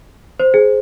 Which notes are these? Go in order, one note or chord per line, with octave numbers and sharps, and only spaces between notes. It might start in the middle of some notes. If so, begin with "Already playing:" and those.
C5
G#4